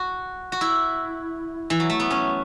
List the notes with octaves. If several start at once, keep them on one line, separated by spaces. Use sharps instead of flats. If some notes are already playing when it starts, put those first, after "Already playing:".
Already playing: F#4
F#4
E4
E3
F#3
A3
B3
C#4